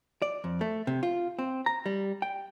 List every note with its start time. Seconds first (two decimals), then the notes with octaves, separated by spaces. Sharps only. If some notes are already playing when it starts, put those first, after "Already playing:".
0.22 D5
0.44 F2
0.61 A3
0.87 C3
1.03 F4
1.39 C4
1.66 A#5
1.86 G3
2.22 G5